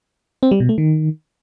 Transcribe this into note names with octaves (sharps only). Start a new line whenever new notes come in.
C4
G3
B2
A3
D#3